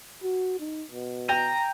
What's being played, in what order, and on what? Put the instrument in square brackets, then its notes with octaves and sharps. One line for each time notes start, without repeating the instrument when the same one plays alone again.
[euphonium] F#4
D#4
B2
[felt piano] G5 G6 D#7 [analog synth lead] A#5